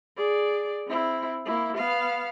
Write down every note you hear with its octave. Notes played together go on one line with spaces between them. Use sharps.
G#4 D5
C4 E4
A#3 E4
B3 F5